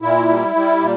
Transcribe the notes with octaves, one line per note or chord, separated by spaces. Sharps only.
A#2 E4
G3
G3
A#2